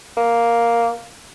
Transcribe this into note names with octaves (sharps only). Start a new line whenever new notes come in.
A#3